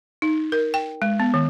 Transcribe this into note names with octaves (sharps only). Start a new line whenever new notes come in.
D#4
A#4
G5
G#3
B3
D#3